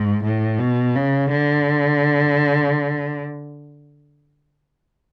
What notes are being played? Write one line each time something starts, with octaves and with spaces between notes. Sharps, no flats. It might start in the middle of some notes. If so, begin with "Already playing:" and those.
Already playing: G#2
A2
B2
C#3
D3